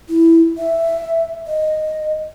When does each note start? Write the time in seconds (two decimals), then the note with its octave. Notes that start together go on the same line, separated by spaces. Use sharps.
0.09 E4
0.58 E5
1.47 D#5